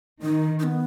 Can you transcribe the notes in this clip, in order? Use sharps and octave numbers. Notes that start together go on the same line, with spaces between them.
D#3 D#4
D#4
B3